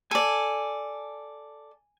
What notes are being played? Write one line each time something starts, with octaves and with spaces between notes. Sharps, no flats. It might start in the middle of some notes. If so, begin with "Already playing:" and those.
A4 D5 G#5